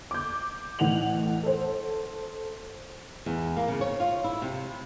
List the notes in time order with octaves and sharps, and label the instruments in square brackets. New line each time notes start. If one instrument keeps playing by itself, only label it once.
[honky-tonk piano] D6 G6
A1 A2 F#5 F7 F#7
A4 C5
[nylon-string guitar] E2
A#3
C#3
C#5
F4
E4
C3